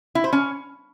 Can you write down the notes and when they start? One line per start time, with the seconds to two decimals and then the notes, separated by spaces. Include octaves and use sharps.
0.15 E4
0.24 C5
0.33 C#4